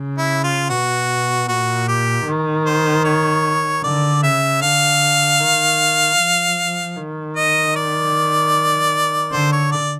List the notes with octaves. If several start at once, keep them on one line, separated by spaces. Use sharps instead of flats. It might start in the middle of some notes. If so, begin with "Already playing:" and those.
Already playing: C#3
E4
F4
B2 F#4
A#2 F#4
G4
D#3
C5
C#5
D3 D5
C#3 E5
D3 F5
D#3
F3
D#3
D#5
D5
D3 C5
C#5
D5